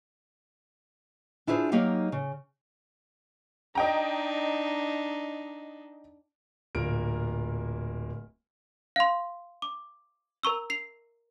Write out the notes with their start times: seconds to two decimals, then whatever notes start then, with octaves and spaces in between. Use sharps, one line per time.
1.47 D4 E4 F4 G#4 C5
1.72 F#3 A#3 D#4 G4 D#5 F5
2.12 C#3
3.75 D4 D#4 D#5 G5 A#5
6.75 D1 A#2 A#3 A#4 D7
8.96 F5 C6
9.62 D6
10.43 A#4 A#5 C#6 E6
10.70 C7 F7